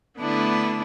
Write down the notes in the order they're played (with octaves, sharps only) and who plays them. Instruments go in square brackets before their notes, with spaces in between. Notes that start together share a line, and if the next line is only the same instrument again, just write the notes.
[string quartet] D3 A3 B3 D4 E4